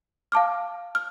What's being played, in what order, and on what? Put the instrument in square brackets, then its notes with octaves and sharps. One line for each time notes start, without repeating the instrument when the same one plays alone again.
[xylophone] F5 A5 D6 F6
F6